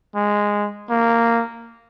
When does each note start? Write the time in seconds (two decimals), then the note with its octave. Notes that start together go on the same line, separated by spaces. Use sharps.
0.16 G#3
0.90 A#3